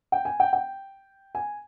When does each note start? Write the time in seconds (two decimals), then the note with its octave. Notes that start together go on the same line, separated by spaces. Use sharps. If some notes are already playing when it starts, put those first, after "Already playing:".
0.12 G5
0.25 G#5
0.40 G5
0.53 G5
1.35 G#5